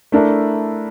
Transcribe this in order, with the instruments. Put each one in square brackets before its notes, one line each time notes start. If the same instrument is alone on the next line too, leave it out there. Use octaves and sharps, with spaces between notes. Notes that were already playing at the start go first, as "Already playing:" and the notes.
[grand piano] A3 E4 A#4 [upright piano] D4